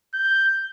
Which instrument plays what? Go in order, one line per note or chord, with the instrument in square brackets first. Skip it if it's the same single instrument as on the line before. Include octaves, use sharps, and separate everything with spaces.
[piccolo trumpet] G6